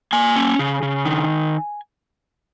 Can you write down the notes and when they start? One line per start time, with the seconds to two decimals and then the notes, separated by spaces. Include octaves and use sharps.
0.13 A#3 G#5
0.36 C#4
0.59 C#3
0.83 C#3
1.05 D#3